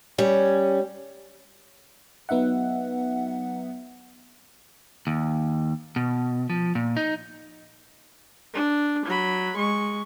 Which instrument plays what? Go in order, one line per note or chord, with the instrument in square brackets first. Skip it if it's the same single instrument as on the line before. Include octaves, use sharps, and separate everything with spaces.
[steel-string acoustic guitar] G3 C#4
[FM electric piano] F#3 B3 D#4 E5 F#5
[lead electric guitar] D#2
B2
F3
A#2
D#4
[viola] D4
F#3 B5
G#3 C#6